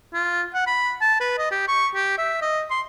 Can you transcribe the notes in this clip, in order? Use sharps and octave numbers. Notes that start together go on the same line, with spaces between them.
F4
F#5
B5
A5
B4
D#5
G4
C#6
G4
E5
D#5
C6